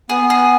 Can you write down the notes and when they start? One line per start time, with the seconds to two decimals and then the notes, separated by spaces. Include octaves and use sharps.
0.09 B3 G#4
0.30 G#4